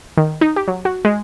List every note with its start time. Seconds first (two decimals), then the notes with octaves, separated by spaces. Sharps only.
0.17 D#3
0.41 D#4
0.56 G4
0.68 F#3
0.85 F#4
1.05 G#3